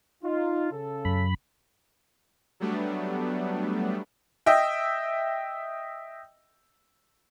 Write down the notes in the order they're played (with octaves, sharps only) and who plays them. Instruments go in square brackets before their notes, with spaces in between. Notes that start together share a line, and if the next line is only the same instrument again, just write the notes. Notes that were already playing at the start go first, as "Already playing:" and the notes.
[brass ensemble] D#4 F4
C#3 A4
[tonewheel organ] F#2 B5
[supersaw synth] F#3 G3 A3 B3 D4
[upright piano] D#5 E5 G5